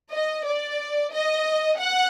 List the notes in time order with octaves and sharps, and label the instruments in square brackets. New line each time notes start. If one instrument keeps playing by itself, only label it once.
[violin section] D#5
D5
D#5
F#5